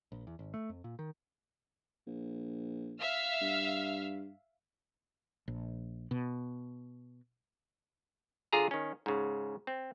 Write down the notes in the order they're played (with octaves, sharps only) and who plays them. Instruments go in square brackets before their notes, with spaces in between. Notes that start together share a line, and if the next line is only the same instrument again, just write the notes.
[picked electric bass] A#1
E2
G#1
A3
F2
A#2
D#3
[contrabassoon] A#1
[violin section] E5 F5 F6
[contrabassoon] G2
[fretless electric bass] A#1
B2
[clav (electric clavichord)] D3 F4 G#4 A#5
D#3 C#4
G#2 C#3
C4